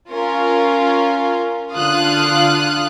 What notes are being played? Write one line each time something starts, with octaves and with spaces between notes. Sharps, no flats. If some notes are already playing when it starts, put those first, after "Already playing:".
C#4 F4 A#4
D3 F4 F5 D#6 F6 F#6